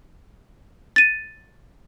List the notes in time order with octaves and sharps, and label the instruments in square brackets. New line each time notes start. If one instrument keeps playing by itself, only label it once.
[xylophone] A6 D#7